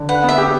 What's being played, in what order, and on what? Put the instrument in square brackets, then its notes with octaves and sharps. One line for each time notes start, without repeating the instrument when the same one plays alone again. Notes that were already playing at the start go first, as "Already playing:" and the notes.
Already playing: [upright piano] D3
[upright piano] B4 [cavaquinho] F#5
[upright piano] B3
[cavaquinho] E5
[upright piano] G4